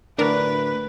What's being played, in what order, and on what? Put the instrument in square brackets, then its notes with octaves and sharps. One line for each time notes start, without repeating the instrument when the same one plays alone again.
[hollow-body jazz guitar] D2 A2 D5 [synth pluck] D4 A#4 [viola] B4